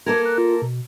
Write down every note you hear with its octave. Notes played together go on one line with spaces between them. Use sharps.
A#3 A4 A#4 G#6
F#6
F4
B2